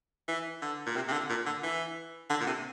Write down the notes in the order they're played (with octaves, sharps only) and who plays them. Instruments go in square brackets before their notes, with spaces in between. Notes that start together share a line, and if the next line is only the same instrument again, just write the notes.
[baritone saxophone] E3
D3
A#2
C3
C3
D3
A#2
D3
E3
D3
A#2
C3